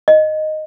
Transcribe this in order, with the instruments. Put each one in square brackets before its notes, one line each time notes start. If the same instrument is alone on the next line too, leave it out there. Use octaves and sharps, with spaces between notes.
[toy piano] D#5